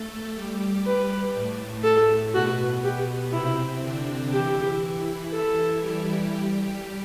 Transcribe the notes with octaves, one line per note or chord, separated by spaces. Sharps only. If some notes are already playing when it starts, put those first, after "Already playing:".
Already playing: A3 A4
G3 G4
G3 G4 B4
A2 A3
A4
B2 B3 F#4
G4
C3 C4 E4
D3 D4
E3 E4 G4
A4
G3 G4
G3 G4